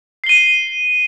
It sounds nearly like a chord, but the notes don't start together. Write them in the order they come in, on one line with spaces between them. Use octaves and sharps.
C7 G7 D#7